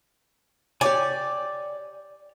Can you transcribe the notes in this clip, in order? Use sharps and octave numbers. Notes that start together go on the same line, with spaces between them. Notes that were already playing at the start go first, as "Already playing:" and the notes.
G4 C#5 D5 G#5